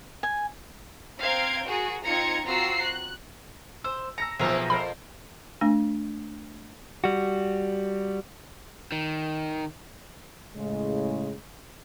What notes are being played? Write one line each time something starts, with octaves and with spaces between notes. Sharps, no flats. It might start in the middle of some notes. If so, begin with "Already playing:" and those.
G#5
C4 F5 A#5 G6 G#6 D7
F#4 G#4 A#4
C4 D#4 F4 A#5 G#6 C#7
C4 F4 F#4 A#5 E6 C7
F#6
C5 E6
A#5 E6 A#6 C#7
B1 B2 F3 A#3 C4 G#4 E5 A#5
F2 A#4 C5 B5
A3 D4 G#5
G3 F#4
D#3
A2 C#3 G#3